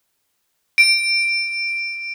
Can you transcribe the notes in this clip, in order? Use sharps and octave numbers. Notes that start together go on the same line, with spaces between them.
D7